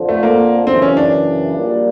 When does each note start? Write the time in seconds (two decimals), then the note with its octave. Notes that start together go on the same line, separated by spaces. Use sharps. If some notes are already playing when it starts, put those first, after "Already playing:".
Already playing: F2 D3 F3
0.09 A3
0.23 A#3
0.67 F#2 C#3 E3 C4
0.82 C#4
0.97 D4
1.55 A#1 A#2 G3 A#3